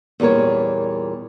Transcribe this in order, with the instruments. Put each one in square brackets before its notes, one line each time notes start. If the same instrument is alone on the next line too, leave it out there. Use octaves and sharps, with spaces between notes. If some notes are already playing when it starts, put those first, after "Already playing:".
[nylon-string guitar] E2 A#2 G3 A#4 C#5